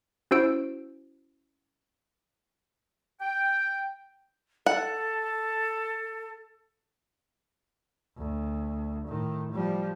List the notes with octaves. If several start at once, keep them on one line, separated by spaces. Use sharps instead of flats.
C#4 E4 F#4 C5 E6 D7
G5
A4 F#5
D2
A2 D#3
F3 G3